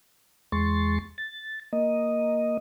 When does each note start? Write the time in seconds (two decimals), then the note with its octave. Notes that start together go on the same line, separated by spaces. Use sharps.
0.52 E2 G#3 C6 C#6 A6
1.18 A6
1.73 A#3 D#5